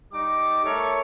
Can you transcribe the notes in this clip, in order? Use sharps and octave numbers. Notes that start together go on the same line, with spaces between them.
G3 D#4 D6
A3 A4 A#4 C#5